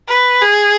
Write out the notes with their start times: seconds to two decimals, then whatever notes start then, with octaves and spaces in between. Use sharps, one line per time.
0.08 B4
0.41 G#4